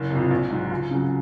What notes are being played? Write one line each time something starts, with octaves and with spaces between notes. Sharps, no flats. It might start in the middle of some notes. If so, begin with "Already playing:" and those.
Already playing: F#1
F2 C3
A#1
G#2 F#3
C#2
C#3 F#3